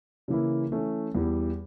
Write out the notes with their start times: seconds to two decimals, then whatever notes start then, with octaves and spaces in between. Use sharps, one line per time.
0.28 C#3 E3 A#3 E4
0.72 E3 A3 C#4
1.15 E2 E3 G3